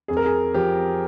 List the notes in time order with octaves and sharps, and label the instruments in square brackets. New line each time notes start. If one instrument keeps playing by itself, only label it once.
[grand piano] F2 G#4
A#4
G#4
F3 G4